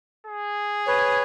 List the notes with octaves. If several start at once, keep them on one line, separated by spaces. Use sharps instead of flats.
G#4
B4 C#5